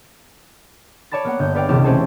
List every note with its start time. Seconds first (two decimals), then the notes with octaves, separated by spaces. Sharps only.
1.11 C#5 D5 A5 B5 A6
1.24 A#3 B3 F#5
1.39 G1 G6
1.55 B4 C#5 D5 F5 G5
1.69 E1 C#2 C3 E4 G4
1.84 A3 C4 C#4 C5 C#5 A5